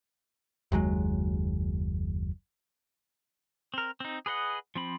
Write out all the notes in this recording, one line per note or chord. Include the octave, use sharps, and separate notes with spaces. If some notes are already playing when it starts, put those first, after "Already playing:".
F#1 D#2 F#3 G#3
C4 A#4
C4 D#4
G#4 B4 D#5 F#5
F3 C4 B5